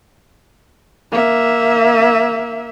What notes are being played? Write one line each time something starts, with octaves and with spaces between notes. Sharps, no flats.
A#3 E5